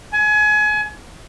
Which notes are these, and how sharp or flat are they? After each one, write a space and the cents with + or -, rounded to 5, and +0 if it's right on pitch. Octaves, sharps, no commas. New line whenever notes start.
G#5 +30